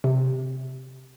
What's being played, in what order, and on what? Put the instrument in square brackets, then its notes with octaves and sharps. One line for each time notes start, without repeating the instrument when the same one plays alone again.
[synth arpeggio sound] C3